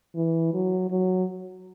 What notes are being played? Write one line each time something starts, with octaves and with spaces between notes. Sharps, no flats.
E3
F#3
F#3